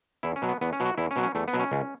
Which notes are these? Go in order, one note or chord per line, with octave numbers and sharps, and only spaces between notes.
E2 E4
C#4
B2 F#3
B3
E2 B3
C#4
B2 F#3
F#4
E2 E4
C#4
B2 F#3
C#4
E2 A3
B3
B2 F#3
C#4
C#2